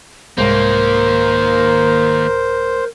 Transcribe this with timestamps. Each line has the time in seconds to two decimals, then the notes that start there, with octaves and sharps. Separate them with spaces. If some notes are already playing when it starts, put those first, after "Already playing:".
0.38 C2 G#2 D#3 A#3 A#4 C5